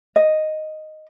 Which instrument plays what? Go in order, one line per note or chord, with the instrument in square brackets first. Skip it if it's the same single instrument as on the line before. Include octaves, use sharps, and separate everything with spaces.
[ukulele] D#5